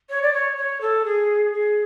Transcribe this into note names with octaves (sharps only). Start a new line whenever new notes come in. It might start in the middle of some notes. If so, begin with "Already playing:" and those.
C#5
D5
C#5
C#5
A4
G#4
G#4